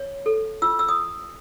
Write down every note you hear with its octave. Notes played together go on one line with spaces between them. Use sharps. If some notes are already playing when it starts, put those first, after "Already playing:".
Already playing: C#5
A4
F4 E6
E6
D#6